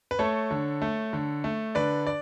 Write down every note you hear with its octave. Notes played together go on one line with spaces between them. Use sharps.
B4
A3 A4 C#5
D3
A3
D3
A3
D3 B4 D5
D5